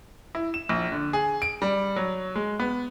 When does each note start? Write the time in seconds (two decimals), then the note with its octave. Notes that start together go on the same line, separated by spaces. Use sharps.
0.35 E4
0.54 E7
0.69 A#1
0.92 D3
1.13 G#4
1.42 D7
1.62 G3
1.96 F#3
2.36 G#3
2.59 B3